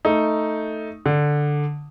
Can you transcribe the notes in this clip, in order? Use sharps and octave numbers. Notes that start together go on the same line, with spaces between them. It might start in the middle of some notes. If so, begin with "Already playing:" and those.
A3 D#4
D3